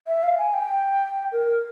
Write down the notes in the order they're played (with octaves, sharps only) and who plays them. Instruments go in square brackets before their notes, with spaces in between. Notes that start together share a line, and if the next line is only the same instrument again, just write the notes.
[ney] E5
F5
G#5
G5
A#4